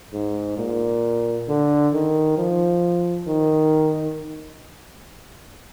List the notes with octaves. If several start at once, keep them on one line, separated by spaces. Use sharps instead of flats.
G#2
A#2
D3
D#3
F3
D#3